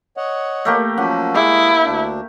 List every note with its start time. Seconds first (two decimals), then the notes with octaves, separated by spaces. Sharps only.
0.17 C#5 D#5 F#5
0.65 A3 A#3 G4
0.98 F3 F#3 C#4 F#5
1.35 G#3 E4 G4 G#4
1.84 D2 D4